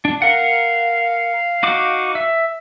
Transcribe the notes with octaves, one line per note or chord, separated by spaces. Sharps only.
D4
A#4 F5 F#5
D#4 F#4 D6
E5